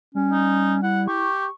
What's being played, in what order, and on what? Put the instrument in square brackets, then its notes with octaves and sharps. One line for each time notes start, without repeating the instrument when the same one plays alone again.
[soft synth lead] G3 [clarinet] C#4
[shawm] D#4
[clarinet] E4 [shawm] F#5
[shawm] G4 [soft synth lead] C#6